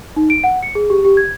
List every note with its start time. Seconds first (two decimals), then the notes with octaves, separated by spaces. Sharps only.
0.16 D#4
0.30 D7
0.44 F#5
0.63 C#7
0.75 G#4
0.90 G4
1.05 G4
1.17 G#6